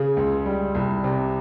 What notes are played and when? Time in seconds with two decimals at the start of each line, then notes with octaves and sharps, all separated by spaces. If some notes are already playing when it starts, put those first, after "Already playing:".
Already playing: C#3 G#4
0.17 C#2
0.46 G3
0.75 C2
1.04 C3